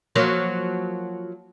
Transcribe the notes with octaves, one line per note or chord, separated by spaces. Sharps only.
F3 F#3 A#3